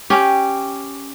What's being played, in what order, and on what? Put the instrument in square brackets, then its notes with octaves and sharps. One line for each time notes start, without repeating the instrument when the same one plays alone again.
[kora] C#4 G4